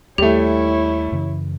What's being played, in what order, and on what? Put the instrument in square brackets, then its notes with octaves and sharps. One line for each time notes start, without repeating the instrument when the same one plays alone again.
[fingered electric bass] D#2 [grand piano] G3 A3 [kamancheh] E4 C#5 [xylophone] G4
[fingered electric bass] F#2 C#3 E3